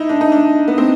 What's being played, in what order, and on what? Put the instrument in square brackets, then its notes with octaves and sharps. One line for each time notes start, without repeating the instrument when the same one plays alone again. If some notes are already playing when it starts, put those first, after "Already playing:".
Already playing: [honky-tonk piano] D#4 E4
D4
D#4
D4
B3
C4